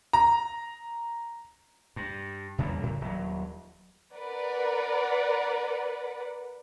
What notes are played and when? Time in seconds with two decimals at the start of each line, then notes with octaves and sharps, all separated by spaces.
0.13 A#5
1.96 G2
2.58 E2 C#3 G3 A#3
2.83 A2
3.01 D#1 F#3
4.14 A#4 B4 D5 F#5